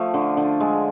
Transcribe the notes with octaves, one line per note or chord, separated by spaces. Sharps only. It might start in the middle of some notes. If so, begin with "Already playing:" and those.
Already playing: F3 A3
D3
D3
G#3